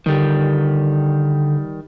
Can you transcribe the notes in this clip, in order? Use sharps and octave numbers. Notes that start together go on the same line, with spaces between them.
D3 D#3 G3